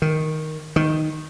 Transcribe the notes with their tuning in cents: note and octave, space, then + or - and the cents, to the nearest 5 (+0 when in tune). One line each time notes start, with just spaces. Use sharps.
D#3 +5
D#3 +0